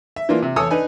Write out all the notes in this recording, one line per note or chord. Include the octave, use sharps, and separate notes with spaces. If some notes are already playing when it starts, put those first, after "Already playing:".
E5
E3 A#3 D4 F4
C3
E2 A4 C#5 G#5 D#6 E6
D4 D#4 B4 G#5